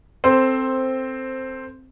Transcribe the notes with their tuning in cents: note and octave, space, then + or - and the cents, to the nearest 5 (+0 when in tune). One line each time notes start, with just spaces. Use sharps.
C4 +0 A4 +10 C5 +5